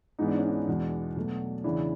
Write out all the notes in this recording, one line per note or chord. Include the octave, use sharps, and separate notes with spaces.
G#2 E3 G#3 B3 D#4
D4
C#4
D4
E2 B2 G#3 B3
B2 F#3 A3
E2 C#3 E3 D4 E4